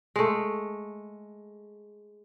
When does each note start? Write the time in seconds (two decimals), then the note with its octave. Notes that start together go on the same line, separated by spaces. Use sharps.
0.16 G#3 A3